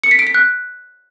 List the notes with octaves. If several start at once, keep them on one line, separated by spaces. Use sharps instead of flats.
C#7
B6
D7
B6
F#6